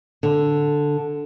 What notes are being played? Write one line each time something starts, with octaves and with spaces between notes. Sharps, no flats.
D3